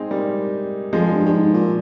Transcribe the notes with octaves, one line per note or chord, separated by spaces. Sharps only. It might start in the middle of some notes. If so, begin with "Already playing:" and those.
Already playing: G#3 C4 D#4
G3 A#3
F2 F3 G#3
G2
G2
G#2
A#2